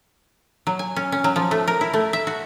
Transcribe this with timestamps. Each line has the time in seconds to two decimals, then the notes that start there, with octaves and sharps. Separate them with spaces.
0.67 F#3
0.79 G#5
0.96 C#4
1.12 C#4
1.24 F#3
1.36 F3
1.51 A3
1.68 A#4
1.81 E4
1.93 A3
2.13 E5
2.27 F#4